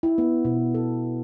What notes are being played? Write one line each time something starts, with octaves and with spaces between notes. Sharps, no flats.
E4
B3
B2
A4